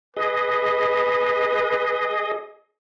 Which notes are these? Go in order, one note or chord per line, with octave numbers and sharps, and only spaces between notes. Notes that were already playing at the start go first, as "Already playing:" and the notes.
G#4 B4 D#5